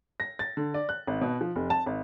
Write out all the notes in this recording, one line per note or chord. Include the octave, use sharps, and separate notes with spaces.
A#6
A6
D3
D5
F#6
G#1
B2
F3
F1
A5
G#1